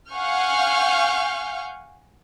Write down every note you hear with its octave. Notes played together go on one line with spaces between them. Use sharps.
F5 F#5 G#5 C#6 F6 G6